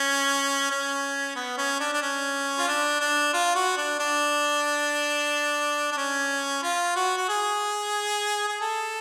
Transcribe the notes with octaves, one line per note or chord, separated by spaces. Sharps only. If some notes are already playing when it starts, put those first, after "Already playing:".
Already playing: C#4
C#4
B3
C#4
D4
D4
C#4
F4
D4
D4
F4
F#4
D4
D4
D4
C#4
F4
F#4
F#4
G#4
G#4
A4